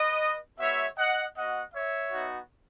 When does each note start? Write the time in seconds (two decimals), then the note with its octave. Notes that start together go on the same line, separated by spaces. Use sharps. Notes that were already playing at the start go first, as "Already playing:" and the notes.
Already playing: B4 D#5
0.59 G#3 B3 F#4 C#5 E5
0.97 D#5 F#5
1.35 B3 F#4 D#5 F#5
1.74 C#5 E5
2.12 B3 D#4 F#4